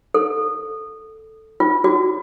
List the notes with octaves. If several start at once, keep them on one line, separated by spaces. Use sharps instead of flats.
A4
F4
F#4